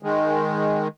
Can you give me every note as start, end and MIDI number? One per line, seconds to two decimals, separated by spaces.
0.03 0.88 51
0.03 0.88 56